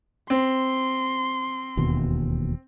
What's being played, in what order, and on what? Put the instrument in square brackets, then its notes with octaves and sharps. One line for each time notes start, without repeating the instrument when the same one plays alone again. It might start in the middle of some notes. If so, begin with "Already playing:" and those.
[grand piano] C4 [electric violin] C6
[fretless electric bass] E1 D#2 B2